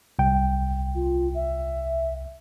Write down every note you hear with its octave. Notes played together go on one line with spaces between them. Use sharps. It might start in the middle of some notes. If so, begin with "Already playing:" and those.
C2 G5
F4
E5